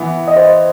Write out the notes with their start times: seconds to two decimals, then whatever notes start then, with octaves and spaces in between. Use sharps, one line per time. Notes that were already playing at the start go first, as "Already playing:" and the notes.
Already playing: E3 B3
0.28 D#5
0.36 C5